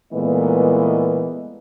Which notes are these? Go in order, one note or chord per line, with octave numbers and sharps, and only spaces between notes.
A#2 E3 G#3 A3 B3 D#5